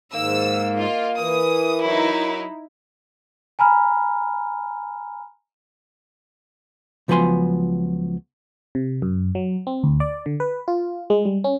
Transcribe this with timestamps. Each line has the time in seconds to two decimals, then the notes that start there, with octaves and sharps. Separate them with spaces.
0.14 G#2 D#3 A#3 E6
0.78 F4 D#5
1.19 E3 A#4 D#6
1.85 F#3 D#4 E4
3.59 G#5 A#5 B5 F6
7.08 C#2 F3 F#3 B3 G#5 C6
8.75 C3
9.02 F#2
9.35 F#3
9.67 C4
9.84 D2
10.00 D5
10.26 D3
10.40 B4
10.68 F4
11.10 G#3
11.25 G3
11.44 C#4